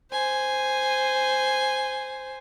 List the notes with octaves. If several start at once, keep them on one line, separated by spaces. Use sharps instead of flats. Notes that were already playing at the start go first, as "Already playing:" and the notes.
C5 G#5